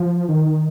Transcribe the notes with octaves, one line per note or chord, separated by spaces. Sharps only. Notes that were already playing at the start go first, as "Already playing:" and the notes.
Already playing: F3
D#3